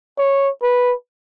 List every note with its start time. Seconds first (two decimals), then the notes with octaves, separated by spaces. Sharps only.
0.18 C#5
0.63 B4